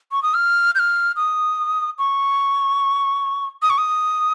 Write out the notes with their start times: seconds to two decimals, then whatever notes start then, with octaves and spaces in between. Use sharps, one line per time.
0.12 C#6
0.23 D#6
0.34 F6
0.75 G6
0.79 F6
1.16 D#6
1.99 C#6
3.62 D#6
3.70 C#6
3.78 D#6